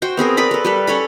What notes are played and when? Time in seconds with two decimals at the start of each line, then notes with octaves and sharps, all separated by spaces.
0.02 F#4 C5 G5
0.17 B3 C4 G#4 A#4
0.37 A#4 B4 D5 B5
0.51 A4 B4
0.64 G3 A4 B4
0.87 C#4 A4 C#5 B5